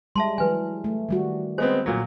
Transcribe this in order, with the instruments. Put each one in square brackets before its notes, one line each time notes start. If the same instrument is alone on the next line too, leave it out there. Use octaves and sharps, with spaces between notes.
[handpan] G3 G#3 [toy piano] E5 A5 C6
[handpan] E3 F#3 [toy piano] B4 G#5
[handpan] A3
D#3 G3 F#4
[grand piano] G#3 B3 C4 [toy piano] C5
[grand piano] A#2 F#3